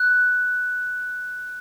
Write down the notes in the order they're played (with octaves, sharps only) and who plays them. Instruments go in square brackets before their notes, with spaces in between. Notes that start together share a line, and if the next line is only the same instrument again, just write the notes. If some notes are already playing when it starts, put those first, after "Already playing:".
Already playing: [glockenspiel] F#6